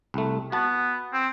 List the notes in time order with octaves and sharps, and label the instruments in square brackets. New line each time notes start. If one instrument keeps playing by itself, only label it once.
[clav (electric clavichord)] C2 A3
[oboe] B3 [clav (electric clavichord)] F#4 A5
[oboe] C4